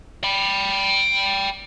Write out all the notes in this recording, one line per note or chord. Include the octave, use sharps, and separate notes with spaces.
G5 B5